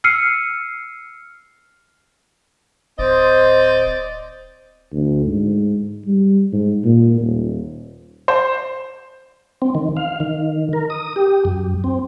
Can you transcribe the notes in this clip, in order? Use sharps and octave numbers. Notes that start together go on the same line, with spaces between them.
E6 F6 C7 C#7 D#7
D1 C4 C5 D5 D#5
D2
G#2
G3
G#2
A#2
D#1
C5
C4
D#3
F5
D#3
A#4
D#6
G4
F#2
C4